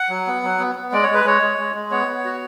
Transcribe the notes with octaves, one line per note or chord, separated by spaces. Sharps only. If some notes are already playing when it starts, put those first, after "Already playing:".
Already playing: F#5
F#3
B3
F#3
B3
B3
G#3 D5
C#5
G#3 B4
G#3 C#5
G#3
G#3
G#3
B3 C#5
B3
F#4